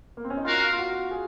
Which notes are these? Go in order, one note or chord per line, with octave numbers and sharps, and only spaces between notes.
A#3
C4
C#4
D#4
F4 F#4 A#4 F5
F4
F#4
G#4